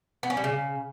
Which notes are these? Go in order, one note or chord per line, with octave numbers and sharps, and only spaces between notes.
B3
C#4
G3
C#3